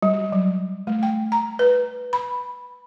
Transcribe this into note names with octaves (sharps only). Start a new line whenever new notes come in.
G3
F#3
A3
G5
A#5
B4
B5